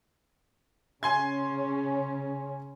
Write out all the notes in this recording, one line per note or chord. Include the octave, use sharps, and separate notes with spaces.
C#3 C#4 G#5 C6 G#6